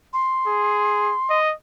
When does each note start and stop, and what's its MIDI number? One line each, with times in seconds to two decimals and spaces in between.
0.13 1.38 84
0.47 1.14 68
1.30 1.53 75